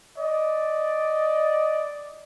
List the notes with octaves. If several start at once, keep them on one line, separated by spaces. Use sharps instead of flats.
D5 D#5